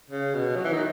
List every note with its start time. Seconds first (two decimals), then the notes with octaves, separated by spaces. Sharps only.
0.10 C#3
0.34 B2
0.56 F#3
0.64 E3
0.73 D#3